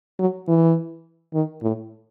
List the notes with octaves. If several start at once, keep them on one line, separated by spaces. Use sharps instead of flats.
F#3
E3
D#3
A2